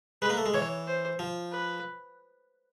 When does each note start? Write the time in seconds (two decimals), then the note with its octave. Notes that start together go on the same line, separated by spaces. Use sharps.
0.22 G#3 B4
0.30 A#3
0.37 A3
0.46 G#3
0.54 E3 C#5
0.87 C5
1.19 F3
1.51 B4